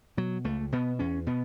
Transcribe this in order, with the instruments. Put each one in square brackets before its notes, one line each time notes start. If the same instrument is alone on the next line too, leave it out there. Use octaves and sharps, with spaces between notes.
[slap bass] B2 F#3
C#2 A3
B2 B3
E2 C#4
B2 B3